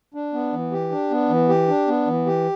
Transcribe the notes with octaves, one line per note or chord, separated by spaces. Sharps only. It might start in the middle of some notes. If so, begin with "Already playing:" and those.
D4
B3
E3
G4
D4
B3
E3
G4
D4
B3
E3
G4